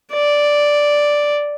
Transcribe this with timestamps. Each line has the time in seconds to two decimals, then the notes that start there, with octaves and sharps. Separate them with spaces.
0.13 D5